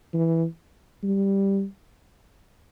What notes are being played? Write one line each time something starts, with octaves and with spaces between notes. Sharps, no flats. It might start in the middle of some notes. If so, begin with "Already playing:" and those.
E3
G3